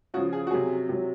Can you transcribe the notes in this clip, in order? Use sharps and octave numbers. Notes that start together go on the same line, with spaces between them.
C#3 F3 F#4
G#4
F#4
C3 F#3 G#4
C3 F#3